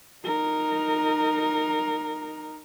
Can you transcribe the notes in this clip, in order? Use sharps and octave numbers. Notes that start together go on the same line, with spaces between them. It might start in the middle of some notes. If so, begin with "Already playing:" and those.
D#4 A#4